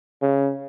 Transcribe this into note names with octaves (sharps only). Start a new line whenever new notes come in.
C#3